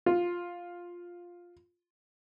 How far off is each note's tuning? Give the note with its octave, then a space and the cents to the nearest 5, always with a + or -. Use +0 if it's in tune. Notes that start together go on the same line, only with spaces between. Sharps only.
F4 +5